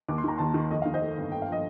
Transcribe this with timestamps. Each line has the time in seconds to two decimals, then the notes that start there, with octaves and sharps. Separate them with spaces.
0.08 D#2 D6
0.18 C6
0.24 D#3 A#5
0.38 D#2 A5 C6
0.54 D#3
0.71 F2 D#5
0.82 D#3 F5
0.94 C5 D#5
1.02 A3
1.17 G1
1.32 D3 G5
1.42 F5
1.48 F3 D#5